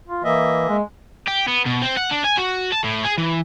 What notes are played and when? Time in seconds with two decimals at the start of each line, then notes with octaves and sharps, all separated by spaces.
0.08 F4
0.24 E3 A#3 D#5 E5
0.69 G#3
1.28 G4
1.48 B3
1.66 B2
1.82 C4
1.97 F#5
2.11 D4
2.24 G#5
2.38 F#4
2.72 A5
2.84 A2
3.05 G#4
3.18 E3